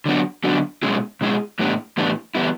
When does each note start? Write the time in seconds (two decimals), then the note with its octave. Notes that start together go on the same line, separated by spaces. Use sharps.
0.06 D3 F#3 B3 D4 F#4
0.44 D3 F#3 B3 D4 F#4
0.83 B2 G#3 C#4 E4 G#4
1.21 B2 G#3 C#4 E4 G#4
1.59 A2 E3 G3 B3 D4
1.98 A2 E3 G3 B3 D4
2.35 E3 G3 B3 E4